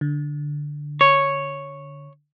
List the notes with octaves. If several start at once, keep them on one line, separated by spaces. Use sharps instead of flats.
D3
C#5